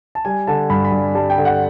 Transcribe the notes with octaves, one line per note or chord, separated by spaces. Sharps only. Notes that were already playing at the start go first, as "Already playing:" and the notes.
A5
G3 G#5
D3 A5
G2 B5
B5
G2
G3 A5
G5
D3
F#5